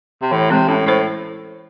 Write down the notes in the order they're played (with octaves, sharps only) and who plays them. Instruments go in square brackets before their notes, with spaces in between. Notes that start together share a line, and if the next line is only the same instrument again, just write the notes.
[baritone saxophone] C3
[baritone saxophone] A2 [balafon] E3
[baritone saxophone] C3 [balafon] G#3 C4
[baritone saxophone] A2 [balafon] C#4
[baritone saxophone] A2 [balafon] E4 C5